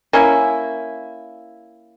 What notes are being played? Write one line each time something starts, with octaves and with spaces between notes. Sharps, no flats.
A#3 C#4 E4